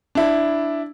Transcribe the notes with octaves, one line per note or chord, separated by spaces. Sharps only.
D4 E4